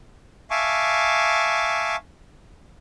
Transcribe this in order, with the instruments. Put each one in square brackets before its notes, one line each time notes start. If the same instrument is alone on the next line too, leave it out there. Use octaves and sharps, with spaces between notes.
[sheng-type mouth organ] E5 F5 G#5 A5 C#6 D6